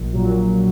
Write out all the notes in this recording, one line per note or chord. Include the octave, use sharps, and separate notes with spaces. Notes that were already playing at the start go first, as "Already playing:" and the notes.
Already playing: A#1
A#2 F#3